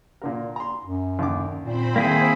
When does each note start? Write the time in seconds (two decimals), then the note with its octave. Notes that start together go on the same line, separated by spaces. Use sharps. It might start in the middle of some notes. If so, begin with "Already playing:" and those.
0.22 A#2 D3 A#4
0.56 A#5 C6
0.85 F#2
1.19 D#2 D3 D6
1.63 A#2 C4 C5 B5
1.96 D#3 A#3 E4 G#4